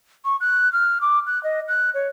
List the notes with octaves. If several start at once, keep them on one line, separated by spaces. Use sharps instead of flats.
C#6
F#6
F6
D6
F#6
D#5
F#6
C#5